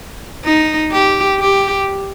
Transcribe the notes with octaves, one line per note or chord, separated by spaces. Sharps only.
D#4
G4
G4